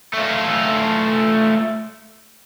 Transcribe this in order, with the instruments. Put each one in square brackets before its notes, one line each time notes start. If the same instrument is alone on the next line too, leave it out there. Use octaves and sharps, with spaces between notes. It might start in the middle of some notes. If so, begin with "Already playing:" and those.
[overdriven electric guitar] A3 F4